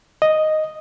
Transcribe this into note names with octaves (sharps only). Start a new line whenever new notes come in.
D#5